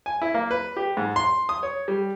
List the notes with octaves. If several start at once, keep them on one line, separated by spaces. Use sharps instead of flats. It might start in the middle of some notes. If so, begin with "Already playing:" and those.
G#5
E4
A#3
B4
G4
G#2
C6
D#6
C#5
G3